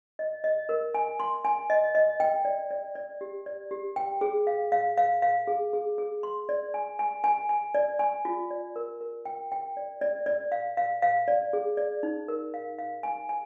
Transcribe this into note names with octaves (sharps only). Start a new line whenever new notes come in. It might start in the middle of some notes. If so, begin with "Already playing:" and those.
D#5
D#5
A#4
G#5
C6
G#5
D#5
D#5
G5
D5
D5
D5
G4
D5
G4
G5
G#4
F5
F5
F5
F5
G#4
G#4
G#4
C6
D5
G#5
G#5
G#5
G#5
D5
G#5
F4
D5
A#4
A#4
G5
G5
D5
D5
D5
F5
F5
F5
D5
G#4
D5
D#4
A#4
F5
F5
G#5
G#5